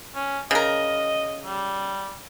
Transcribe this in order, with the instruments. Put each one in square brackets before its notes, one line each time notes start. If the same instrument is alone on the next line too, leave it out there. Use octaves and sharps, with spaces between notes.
[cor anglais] C#4
[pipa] C#3 A#4 [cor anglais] D#5
[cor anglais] G3